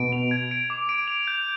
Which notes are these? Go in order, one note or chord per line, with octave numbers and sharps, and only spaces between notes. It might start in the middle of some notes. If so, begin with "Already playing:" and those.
Already playing: B2 D7
F7
G#6
D7
D6
D7
F7
G6